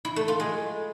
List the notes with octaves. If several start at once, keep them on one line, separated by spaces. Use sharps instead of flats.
E4
A3
F4
G#3